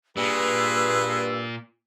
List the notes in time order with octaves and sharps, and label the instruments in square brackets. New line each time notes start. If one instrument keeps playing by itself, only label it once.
[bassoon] G2 [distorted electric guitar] A#2 [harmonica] G#4 B4 [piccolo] E6